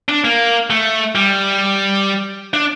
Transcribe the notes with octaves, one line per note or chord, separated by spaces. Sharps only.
D4
A#3
A3
G3
D4